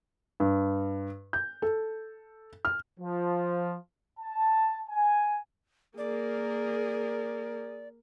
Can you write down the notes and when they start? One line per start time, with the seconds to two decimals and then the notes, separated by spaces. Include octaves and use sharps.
0.40 G2
1.33 G6
1.62 A4
2.65 F6
3.00 F3
4.19 A5
4.89 G#5
5.98 A#3 G#4 A#4 D5